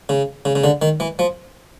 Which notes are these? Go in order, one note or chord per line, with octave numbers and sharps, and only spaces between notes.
C#3
C#3
C#3
D3
D#3
E3
F3